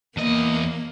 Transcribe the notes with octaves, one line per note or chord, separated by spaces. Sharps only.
E2 A#3 D#5